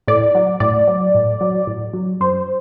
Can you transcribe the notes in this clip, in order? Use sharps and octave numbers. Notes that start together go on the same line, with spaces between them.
A2 D5
F#3
A2 D5
F#3
A2
F#3
A2
F#3
F#2 C5